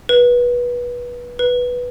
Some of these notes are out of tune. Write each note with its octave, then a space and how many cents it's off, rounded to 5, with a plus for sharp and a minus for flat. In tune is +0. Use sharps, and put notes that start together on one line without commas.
B4 -20
B4 -5